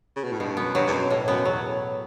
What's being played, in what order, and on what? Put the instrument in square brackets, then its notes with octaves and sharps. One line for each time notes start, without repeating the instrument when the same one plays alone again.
[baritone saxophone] C#3
B2
A2
[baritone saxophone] G2 [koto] B2
[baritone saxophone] F#2 [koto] B3
[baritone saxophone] G2 [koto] F#3
[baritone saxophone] E2
[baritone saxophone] F#2 [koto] B2
[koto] A2
[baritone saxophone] F#2 [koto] B3
[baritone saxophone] E2 [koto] F#3